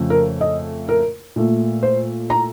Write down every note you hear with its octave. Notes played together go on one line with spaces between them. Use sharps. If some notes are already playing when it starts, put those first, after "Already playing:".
Already playing: F2 C#3 A3
A#4
D#5
A#4
A#2 A3
C5
A#5